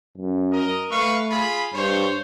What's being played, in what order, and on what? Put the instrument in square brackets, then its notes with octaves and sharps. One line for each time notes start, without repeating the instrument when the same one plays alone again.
[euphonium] F#2
[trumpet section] A#4 D#5
[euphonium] A3 [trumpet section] B4 F5 C#6
[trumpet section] F4 G#4 B5
[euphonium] G2 [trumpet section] C5 C#5